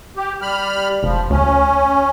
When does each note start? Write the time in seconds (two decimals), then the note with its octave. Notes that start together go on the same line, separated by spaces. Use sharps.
0.17 G4
0.42 G3 B5 F6
1.03 F1 F3
1.30 D2 C#4